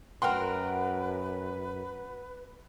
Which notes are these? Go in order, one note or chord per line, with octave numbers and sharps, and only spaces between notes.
F#2 F#4 A#4 B4 G5 C6